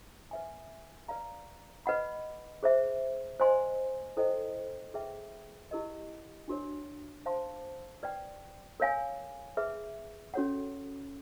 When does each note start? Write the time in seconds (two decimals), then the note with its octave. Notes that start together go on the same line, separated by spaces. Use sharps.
0.31 B4 E5 G#5
1.08 B4 D5 F5 A#5
1.86 B4 D#5 F#5 B5
2.63 G#4 C5 E5
3.40 C5 D#5 G#5 C6
4.17 E4 A4 C5 D#5 G5
4.94 G#4 B4 E5 G5
5.71 E4 G4 A#4 D#5
6.48 D4 F#4 A#4 C#5
7.26 C5 F5 A5 C6
8.03 B4 D5 G5
8.80 A#4 C#5 F5 G#5
9.57 G#4 B4 E5
10.34 C#4 F#4 A4 C#5 F#5